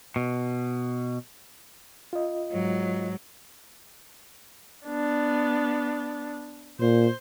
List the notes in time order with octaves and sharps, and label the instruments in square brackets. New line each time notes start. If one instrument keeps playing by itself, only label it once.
[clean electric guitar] B2
[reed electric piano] F4 D#5
[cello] G#2 F#3
[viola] B3 D4
[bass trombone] A#2 [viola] C5